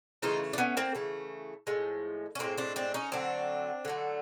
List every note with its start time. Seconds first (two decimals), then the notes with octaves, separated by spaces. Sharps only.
0.22 C#3 E3 A3 D#4 F4
0.53 D4
0.58 B3 C#4
0.77 A#3 C4
0.95 C#3 E3 A3
1.67 A2 F3 G#3
2.35 C#4
2.39 A2 F3 G#3 A#3 C4
2.58 C4 D4
2.76 C4 D4
2.94 C#4 D#4
3.12 D3 F#3 A3 C4 D4
3.85 D3 F#3 A3